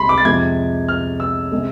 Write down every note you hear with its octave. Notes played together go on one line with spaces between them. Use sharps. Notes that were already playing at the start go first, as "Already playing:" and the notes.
Already playing: C2 C3 G#3 B5 C6
D6
A6
F2 C3 G#3 G#6
F6
E6
C3 G#3